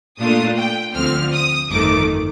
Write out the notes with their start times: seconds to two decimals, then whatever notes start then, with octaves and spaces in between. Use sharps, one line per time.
0.19 A#2 A3 D4 F4 D#6
0.58 G5
0.95 D2 D3 F3 C4 F6
1.32 D#6
1.70 G1 F2 D#3 A3 D6